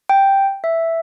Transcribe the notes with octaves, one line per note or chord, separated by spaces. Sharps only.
G5
E5